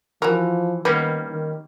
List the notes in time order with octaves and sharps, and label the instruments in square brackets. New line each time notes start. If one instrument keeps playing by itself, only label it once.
[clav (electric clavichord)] E3 [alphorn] F3 [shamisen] F#4 A#4
[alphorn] D#3 [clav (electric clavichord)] G3 A#3 C#4 [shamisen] B3 B4
[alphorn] D#3